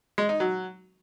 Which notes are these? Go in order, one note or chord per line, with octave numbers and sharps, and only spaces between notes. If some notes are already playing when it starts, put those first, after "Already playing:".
G#3
D#4
F#3